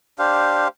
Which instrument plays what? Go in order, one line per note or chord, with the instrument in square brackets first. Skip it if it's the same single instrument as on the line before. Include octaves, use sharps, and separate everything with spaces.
[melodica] D4 G4 C5 F5